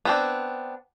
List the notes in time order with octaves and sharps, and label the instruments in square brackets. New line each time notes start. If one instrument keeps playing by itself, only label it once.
[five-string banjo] B3 C4 D4